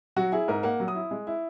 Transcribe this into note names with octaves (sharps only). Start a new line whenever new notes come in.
F#3 F#4
E4 G#4
G#2 A#4
A#3 F#5
F#3
D#6
E4
G#3
E4